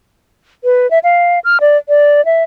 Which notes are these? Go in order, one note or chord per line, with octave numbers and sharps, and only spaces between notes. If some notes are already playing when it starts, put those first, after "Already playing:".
B4
E5
F5
F6
D5
D5
E5